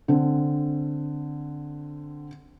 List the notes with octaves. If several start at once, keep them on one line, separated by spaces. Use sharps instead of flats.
D3 C4